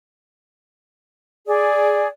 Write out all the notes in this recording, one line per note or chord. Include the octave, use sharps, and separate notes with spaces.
G#4 D5